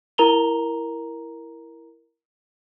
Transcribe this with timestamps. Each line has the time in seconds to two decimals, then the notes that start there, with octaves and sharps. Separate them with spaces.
0.18 E4 A#4 A#5 F7 G7